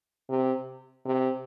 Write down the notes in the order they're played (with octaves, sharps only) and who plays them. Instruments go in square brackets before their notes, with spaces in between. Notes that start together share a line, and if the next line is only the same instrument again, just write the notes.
[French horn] C3
C3